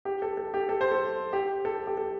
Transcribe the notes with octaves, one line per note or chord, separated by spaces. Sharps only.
G4
A4
A4
G4
A4
C5
A4
G4
A4
G4
A4